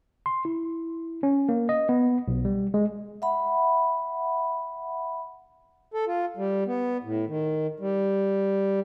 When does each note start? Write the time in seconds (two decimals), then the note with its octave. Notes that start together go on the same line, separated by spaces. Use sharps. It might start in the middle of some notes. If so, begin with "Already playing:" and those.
0.26 C6
0.45 E4
1.23 C#4
1.49 A#3
1.69 D#5
1.89 B3
2.28 B1
2.45 G3
2.74 G#3
3.22 E5 F#5 B5
5.93 A4
6.07 F4
6.37 G3
6.67 B3
7.04 A2
7.28 D#3
7.80 G3